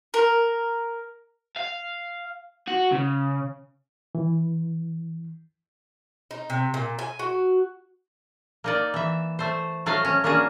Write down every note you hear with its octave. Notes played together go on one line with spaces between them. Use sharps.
A#4
F5
F#4
C#3
E3
D#4
C3
A#2
G#5
F#4
A#3 D#4 D5
E3 E5
A3 C5
F#3 A3 F#4 D#5 F5
C#4
A#3 C#4 D4 F#4 G#4